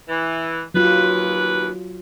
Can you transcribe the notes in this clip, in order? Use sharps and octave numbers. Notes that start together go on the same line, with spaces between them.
E3
D#2 F#3 F4 B4